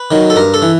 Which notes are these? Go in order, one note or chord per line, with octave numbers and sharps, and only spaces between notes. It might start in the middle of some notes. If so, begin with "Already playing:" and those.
Already playing: B4
D#3 F#3
A4
G2 A#4
A4
E3